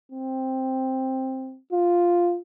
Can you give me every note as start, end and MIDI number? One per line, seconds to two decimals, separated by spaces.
0.12 1.58 60
1.72 2.39 65